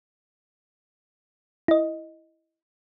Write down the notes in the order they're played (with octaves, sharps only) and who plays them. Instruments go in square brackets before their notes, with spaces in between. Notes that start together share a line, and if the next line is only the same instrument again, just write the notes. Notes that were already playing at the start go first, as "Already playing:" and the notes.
[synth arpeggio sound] E4 D#5